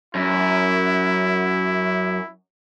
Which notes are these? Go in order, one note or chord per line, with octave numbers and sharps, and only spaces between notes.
F#2 E4